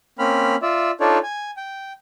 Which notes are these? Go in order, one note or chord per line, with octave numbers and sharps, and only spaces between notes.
A#3 C4 C#4 B5 F6
F4 D5 E5
D4 D#4 F4 A4 C#5 D5
G#5
G5